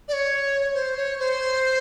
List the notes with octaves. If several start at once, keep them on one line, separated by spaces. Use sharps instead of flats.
D5
C#5
C5
C#5
C5